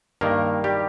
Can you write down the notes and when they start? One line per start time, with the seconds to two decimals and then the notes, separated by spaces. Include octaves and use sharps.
0.21 G2 D#3 A#3 A#4
0.64 G3 G4